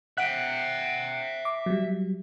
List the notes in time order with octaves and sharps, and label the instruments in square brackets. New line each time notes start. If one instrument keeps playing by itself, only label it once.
[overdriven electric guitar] E5 G5 [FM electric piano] F#5 F#6
[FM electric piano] D6
F#3 G3